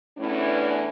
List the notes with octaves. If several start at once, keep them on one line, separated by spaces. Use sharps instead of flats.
E2 A2 E3 C#4 D4